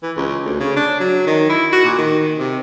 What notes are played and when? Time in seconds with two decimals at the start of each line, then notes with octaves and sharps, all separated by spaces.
0.03 E3
0.16 C#2
0.45 D2
0.60 C#3
0.76 D4
1.00 F#3
1.27 D#3
1.49 E4
1.72 F#4
1.84 A#2
1.98 D#3
2.39 C3